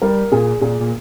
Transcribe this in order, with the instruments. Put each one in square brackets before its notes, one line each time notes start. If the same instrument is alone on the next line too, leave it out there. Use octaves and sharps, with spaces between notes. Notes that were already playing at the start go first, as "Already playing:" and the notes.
[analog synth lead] G3 [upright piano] A#4
[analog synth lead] A#2 [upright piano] G#4
[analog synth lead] A#2 [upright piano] G#4
[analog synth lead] A#2